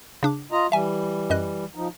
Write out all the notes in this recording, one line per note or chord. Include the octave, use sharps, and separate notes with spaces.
C#3 D4 D6
F4 D#5 A#5
E3 G3 E5 G#5
F#2 D#5 F#6
F3 D#4